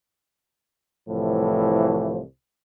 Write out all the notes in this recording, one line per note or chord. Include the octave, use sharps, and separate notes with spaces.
C2 A2 E3 F3